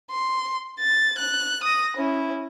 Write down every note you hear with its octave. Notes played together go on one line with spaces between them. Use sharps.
C6
A6
F#6
D#6 A#6
C#4 E4